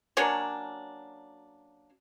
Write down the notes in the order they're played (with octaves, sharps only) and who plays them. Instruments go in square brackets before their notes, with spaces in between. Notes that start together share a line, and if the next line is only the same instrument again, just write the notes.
[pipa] F#3 A#3 C#4 D4